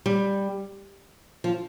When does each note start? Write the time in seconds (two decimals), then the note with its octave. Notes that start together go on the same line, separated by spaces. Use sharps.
0.06 G3
1.44 F3